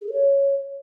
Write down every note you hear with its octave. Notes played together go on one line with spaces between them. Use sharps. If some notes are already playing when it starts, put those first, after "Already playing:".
G#4
A4
C#5